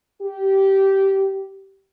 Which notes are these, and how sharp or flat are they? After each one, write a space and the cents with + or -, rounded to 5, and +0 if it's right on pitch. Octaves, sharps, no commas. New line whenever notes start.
G4 -15